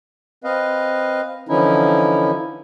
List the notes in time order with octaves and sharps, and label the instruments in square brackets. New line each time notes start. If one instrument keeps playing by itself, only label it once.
[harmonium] C4 B4 D#5 F5
D3 E3 F3 C#4 D#4 E4